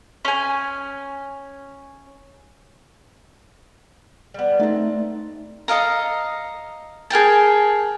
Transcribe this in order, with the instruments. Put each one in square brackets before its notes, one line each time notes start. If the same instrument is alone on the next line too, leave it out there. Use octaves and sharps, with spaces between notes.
[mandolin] C#4 G#5
[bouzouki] G3 B3
[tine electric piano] A3 D#4 [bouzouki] C4 A5
[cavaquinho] A4 D#5 F5 A#5
G#4 A#4 G5 A5